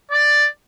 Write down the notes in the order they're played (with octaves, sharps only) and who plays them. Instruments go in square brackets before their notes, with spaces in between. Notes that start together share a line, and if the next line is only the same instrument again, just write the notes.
[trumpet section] D5